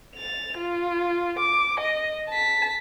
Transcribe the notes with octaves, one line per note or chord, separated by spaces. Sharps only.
A6 F7
F4
D6
D#5
A5 B6